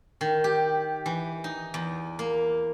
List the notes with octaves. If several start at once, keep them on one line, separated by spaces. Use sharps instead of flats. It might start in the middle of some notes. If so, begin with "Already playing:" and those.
D#3
G4
E3
D#4
E2
A#3